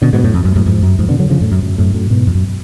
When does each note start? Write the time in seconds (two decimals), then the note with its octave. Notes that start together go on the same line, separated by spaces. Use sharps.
0.02 B2 D3
0.13 G#2 B2
0.24 F#2 A2
0.34 F2
0.45 F#2
0.56 F#2 A2
0.66 F2 G#2
0.82 F#2
0.99 F2 G#2
1.09 B2 D3
1.19 D3 F#3
1.30 C#3 F3
1.41 F#2 A2
1.52 F#2
1.63 F#2
1.78 F#2 A2
1.94 F#2 A2
2.10 G#2 B2
2.27 F2
2.35 F#2